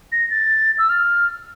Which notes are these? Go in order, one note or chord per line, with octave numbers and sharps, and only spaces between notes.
A#6
A6
E6
F6